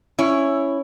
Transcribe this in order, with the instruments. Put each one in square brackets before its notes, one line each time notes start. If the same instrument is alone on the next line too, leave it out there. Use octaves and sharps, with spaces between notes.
[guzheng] C#4 [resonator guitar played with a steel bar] E4 C#5